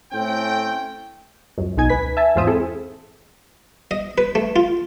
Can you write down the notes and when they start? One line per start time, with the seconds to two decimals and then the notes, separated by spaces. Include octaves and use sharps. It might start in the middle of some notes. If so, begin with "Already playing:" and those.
0.13 A2 A3 C4 C#4 G5
1.58 C#2 F#2
1.77 B1 B2 D#4 G#5 G#6
1.89 C#2 B4 B6
2.17 E5 G#5 A5
2.35 E2 G#2 F4 C5 E5 D#6
2.47 C4 E4 G#4 A4
3.91 D#5
4.18 B4
4.35 A3
4.56 F4